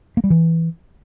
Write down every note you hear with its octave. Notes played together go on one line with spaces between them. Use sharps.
A#3
G3
E3